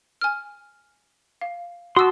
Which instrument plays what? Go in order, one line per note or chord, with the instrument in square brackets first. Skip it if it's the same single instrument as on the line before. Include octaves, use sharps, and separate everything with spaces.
[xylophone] G#5 F6
F5
[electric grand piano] F#4 [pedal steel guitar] A5 C6 [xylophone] D#6 E6